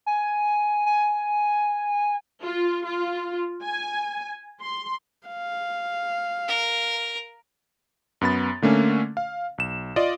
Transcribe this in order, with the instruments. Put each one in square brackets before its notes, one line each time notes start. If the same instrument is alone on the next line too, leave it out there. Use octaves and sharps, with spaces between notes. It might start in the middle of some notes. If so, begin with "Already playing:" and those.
[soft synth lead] G#5
G#5
[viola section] F4
F4
G#5
C6
[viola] F5
[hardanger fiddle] A#4
[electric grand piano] F#2 B3 B5 A6
D3 A3 A#3 C#4
F5
B1 E7
F4 D5 D#5